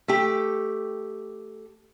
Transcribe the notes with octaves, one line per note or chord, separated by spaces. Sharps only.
A3 G4